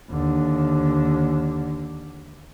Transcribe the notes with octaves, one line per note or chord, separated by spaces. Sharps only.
D#2 D3